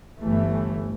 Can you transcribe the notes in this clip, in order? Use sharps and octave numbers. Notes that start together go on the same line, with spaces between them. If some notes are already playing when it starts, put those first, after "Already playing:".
G1 E3 A3